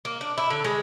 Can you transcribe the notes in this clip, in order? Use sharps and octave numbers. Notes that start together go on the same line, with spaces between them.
A#3
D4
E4
D3
G#3